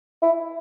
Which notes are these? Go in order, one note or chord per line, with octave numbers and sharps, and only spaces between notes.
E4